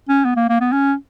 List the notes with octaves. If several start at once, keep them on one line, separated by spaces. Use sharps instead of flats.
C#4
B3
A#3
A#3
B3
C#4